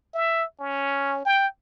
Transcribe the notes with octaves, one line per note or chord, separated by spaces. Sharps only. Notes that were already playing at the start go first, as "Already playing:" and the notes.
E5
C#4
G5